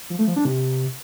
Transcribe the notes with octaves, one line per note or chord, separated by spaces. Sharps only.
F3
A3
F3
D4
C3